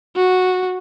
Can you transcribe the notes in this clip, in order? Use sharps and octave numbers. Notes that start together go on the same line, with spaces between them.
F#4